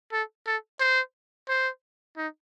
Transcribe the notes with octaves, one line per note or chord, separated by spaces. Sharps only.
A4
A4
C5
C5
D#4